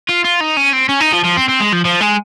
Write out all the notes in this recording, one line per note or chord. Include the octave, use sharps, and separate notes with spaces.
F4
F4
D#4
C#4
C4
C#4
D#4
F3
F3
C4
C4
G#3
F3
F3
G#3